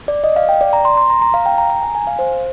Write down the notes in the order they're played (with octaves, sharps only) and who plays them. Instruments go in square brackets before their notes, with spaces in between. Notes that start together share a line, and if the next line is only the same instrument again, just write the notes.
[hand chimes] D5
D#5
F5
G5
D5
A#5
C6
C6
A#5
A#5
F5
G5
A#5
A#5
G#5
G#5
F5
C5